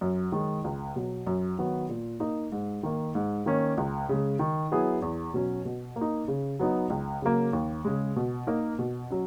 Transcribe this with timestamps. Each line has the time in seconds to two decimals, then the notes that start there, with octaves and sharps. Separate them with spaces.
0.01 F#2
0.32 D#3 G#3
0.64 C#2
0.96 B2 F#3
1.27 F#2
1.58 D#3 F#3 B3 F#4
1.89 A#2
2.20 A#3 D#4
2.52 G#2
2.83 D#3 A#3
3.15 G#2
3.46 D#3 A#3 C#4
3.78 C#2
4.09 C#3 G#3
4.39 D#3
4.71 F#3 B3 E4 G#4
5.02 E2
5.34 B2 F#3 C#4
5.65 B2
5.96 A#3
6.01 D#4
6.28 C#3
6.59 F#3 B3 D#4
6.90 C#2
7.22 C#3 F#3 A#3
7.53 D#2
7.85 C#3 G#3
8.16 B2
8.47 A#3 D#4 A#4
8.79 B2
9.10 F#3 C#4